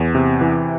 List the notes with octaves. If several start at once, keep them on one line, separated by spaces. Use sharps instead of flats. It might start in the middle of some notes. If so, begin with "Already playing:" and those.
Already playing: E2
C3
E3